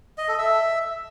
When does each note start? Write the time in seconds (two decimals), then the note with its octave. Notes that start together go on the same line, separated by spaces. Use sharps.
0.18 D#5
0.28 A4
0.38 E5